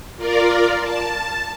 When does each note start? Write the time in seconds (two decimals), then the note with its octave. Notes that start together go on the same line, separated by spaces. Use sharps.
0.17 F4 A#4 D5
0.80 A5